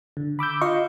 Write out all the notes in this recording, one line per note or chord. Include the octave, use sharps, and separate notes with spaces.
D3
B5 D6 E6 G6
F4 D#5 F5 C6 C#6